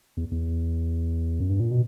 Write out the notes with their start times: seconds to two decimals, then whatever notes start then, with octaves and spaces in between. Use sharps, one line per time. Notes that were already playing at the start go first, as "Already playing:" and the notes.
0.17 E2
0.31 E2
1.40 F#2
1.49 G2
1.60 A#2
1.71 B2